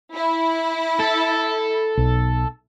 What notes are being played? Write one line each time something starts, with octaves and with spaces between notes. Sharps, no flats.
E4
A4
B1